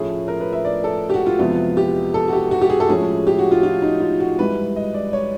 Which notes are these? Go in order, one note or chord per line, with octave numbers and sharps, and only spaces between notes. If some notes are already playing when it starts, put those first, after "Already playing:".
Already playing: A2 F3 A3 C#4 G#4
A#4
B4
E5
D5
A4
G4
F#4
F4
F2 C3 E3 G#3 B3 F4
G4
A4
F#4
G4
F#4
G4
G#4
A4
A2 F3 G#3 C#4 G#4
G4
F#4
F4
F4
D#4
F4
F#4
G#2 E3 G3 B4
D#5
D5
C#5